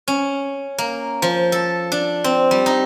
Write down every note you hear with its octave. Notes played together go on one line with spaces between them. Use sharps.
C#4
A#3
F3
A4
D4
C4
G3
D#4